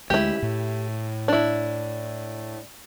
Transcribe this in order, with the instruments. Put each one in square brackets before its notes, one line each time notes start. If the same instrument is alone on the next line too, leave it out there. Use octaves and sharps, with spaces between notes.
[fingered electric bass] D2 F#3 G#3 [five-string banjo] E4 G4
[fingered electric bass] A2
[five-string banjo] D4 E4